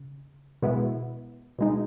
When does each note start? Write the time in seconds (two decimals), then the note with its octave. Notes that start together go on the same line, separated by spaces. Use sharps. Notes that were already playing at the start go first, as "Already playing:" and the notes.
Already playing: C#3
0.62 B2 G#3 B3 E4
1.59 B2 G#3 D#4